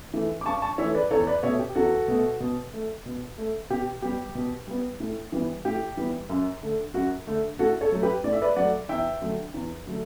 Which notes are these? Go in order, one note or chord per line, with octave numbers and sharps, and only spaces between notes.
E3 A3
D6
G2 A5 C#6
A5 C#6
E3 A3 C#5 E5
B4 D5
E2 A4 C#5
B4 D5
B2 A3 C#5 E5
G4
E2 F#4 A4
B2 A3
B2
A3
B2
A3
B2 G4
G3 B3 G4
B2
G3 B3
A2
E3 G3 B3
A2 G4
E3 G3 B3
F#2
D3 A3
F#2 F#4
D3 A3
A2 F#4 A4
A4 C#5
F#3 A3
G4 B4
A2 D5
E5
B4 D5
F#3 A3 D5 F#5
E2 E5 G5
D3 F#3 A3
E2
D3 F#3 A3